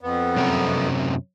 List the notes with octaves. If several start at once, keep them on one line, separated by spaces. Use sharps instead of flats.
F2 B3
F#2 C3 A#4